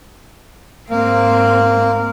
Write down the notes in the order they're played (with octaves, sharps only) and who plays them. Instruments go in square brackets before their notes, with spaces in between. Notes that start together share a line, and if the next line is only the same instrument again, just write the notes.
[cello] G#2 C4 [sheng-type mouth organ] A#3